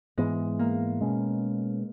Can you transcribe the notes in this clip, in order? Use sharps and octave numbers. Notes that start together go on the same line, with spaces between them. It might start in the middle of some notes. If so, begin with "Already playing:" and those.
G#2 E3 G#3 B3
A#3
B2 G#3 C#4